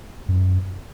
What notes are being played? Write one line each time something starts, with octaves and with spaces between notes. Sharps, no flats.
F#2